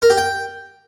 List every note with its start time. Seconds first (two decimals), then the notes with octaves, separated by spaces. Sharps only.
0.02 A#4
0.10 G4
0.18 G5